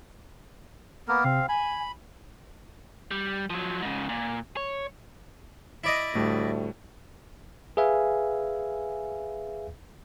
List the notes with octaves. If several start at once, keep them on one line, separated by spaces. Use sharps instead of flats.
A#3 B3 A#4
C3 C4 F5
G#5 B5
G3
F3 F#3
G#2 C#3
A#2
C#5
E4 D5 D#5
D2 A2 G3 A3
G#4 B4 E5 F5 G#5